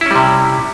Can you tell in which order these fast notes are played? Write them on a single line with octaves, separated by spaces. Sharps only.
E4 C#4 G3 C3